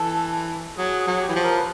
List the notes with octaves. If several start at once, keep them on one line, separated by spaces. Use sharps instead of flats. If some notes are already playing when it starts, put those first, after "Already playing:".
Already playing: E3 A4
F#3 G#4
G#4
F#3
G4
E3
F3
A#4
B4